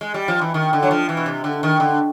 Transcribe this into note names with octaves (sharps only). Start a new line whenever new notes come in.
G#3
G3
F3
E3
D#3
D3
F#3
F3
E3
B2
C3
D3
D#3
D3